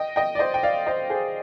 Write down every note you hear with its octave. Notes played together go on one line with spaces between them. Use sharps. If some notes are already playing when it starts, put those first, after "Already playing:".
Already playing: D#5 G5
D#5 G5
D5
C5 D#5
G5
D5 F5
C5 D#5
G#4 C5